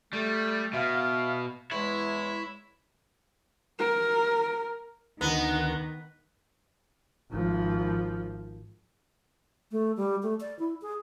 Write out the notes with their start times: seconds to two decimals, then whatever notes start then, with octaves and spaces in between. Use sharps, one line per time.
0.13 G3 A3
0.73 B2 E5 F5
1.71 E2 G#3 E4 C#5
3.79 A#4
5.21 D2 D#3 B3 A#5 F#6
7.31 G#1 F3
9.72 A3
9.97 G3
10.23 A3
10.40 D5
10.59 E4
10.82 G#4